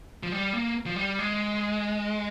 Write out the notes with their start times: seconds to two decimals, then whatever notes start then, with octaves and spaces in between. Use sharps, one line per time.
0.23 F3
0.32 G3
0.53 A#3
0.86 F3
0.96 G3
1.19 G#3